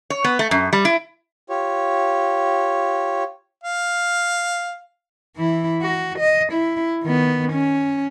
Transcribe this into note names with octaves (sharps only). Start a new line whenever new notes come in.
C#5
B3
A3
F#2
G3
E4
F4 G4 C#5
F5
E3 E4
F#4
D#5
E4
D#3 B3
C#4